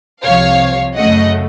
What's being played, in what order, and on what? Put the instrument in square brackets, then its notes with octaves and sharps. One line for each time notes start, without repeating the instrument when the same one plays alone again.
[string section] C2 C3 F3 C#5 F5
F#2 C#3 A3 D#5 F#5